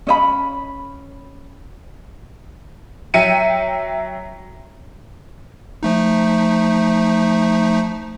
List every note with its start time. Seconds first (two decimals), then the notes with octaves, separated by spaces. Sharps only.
0.07 C#4 D#5 B5
3.14 F#3 E5 G5 C#7 D#7
5.83 F3 A3 D#4